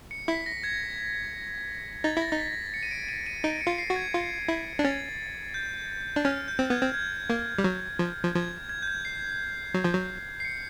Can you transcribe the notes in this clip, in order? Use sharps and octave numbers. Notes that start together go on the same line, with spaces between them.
C#7
E4 B6
A#6
G#6
D#4 A6
E4 A#6
D#4
B6
C#7
D#7
D7
D#7
D#7
D#4 D7
C#7
F4
C7
F#4
G#6
F4
E4
D4
C#4 A6
G6
D4
C#4 F6
G6
C4
B3 G#6
C4
G#6
A#3
G3
F#3
F3
F3
F3 G#6
G#6
G6
G#6
C7
F#3
F3
F#3
C7
C#7